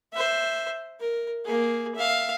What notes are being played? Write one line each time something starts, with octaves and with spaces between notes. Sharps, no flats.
C5 E5
A#4
A#3 G#4
E5 F5